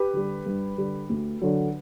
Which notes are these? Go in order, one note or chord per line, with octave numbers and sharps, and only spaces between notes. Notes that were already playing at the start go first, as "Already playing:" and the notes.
Already playing: G4 B4
D3 G3
G2
D3 G3
D2
D3 F#3